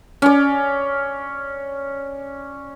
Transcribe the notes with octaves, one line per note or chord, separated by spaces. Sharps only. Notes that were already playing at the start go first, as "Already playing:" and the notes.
C#4 D5